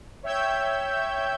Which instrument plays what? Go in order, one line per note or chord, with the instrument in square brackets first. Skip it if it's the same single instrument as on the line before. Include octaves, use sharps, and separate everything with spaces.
[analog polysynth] C#5 E5 G5 E6 G6 G#6